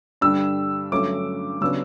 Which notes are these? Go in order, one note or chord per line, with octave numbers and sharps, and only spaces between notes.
G2 D3 G3 D4 E6
G2 D3 F#3 A3 C#4 D6
C#3 F#3 B3 D4 E6